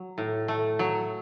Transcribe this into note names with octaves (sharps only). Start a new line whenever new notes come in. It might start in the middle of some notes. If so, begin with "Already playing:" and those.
Already playing: F#3
A2
A3
F#3